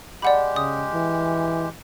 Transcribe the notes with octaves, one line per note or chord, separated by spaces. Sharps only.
G#3 G4 D5 F#5 B5
C#3 D#6
E3